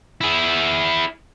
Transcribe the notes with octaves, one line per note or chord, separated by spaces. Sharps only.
E4 G#4